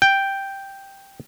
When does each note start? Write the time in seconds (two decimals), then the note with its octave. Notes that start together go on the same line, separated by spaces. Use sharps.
0.02 G5